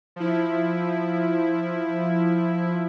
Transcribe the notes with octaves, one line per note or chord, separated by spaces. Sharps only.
F3 E4